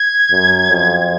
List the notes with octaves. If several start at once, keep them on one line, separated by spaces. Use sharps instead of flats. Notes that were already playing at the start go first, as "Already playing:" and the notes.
Already playing: G#6
F#2
F2